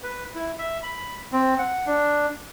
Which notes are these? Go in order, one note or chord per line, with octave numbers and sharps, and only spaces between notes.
B4
E4
E5
B5
C4
F#5
D4